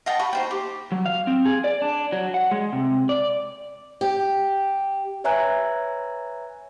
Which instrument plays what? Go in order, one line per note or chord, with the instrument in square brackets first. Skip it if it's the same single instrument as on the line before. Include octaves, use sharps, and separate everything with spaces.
[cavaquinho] D#5 F#5 G5 A5
F#4 B5 C#6
D#4 C5 G5
G4
[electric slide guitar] F#3
F5
C4
G#4
D5
D4
F#3
F#5
G#3
C3
D5
[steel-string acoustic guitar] G4
[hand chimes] B4 C#5 E5 G#5 A#5 F#6